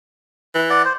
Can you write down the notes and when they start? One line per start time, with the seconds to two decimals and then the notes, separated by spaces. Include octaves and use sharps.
0.55 E3
0.70 D5 F#5
0.85 C5